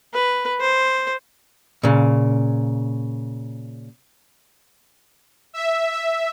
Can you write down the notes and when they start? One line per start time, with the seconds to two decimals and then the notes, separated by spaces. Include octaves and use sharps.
0.13 B4
0.60 C5
1.83 A#2 C#3
5.53 E5
5.93 E5